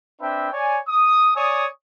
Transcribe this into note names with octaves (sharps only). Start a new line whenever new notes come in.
C4 D4 B4 E5 G5
C#5 D5 G#5
D#6
C#5 D5 G#5 D#6